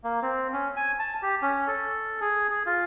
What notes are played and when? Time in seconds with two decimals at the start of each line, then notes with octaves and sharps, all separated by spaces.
0.04 A#3
0.22 C4
0.53 C#4
0.76 G#5
0.99 A5
1.22 G4
1.42 C#4
1.67 A4
2.21 G#4
2.50 G#4
2.66 F4